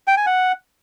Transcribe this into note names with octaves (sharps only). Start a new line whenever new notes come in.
G5
G#5
F#5